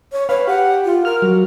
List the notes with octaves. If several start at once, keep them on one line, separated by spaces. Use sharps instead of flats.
C#5
B4 C#5 F5
G4 F#5
F4
A#4 F6
F#3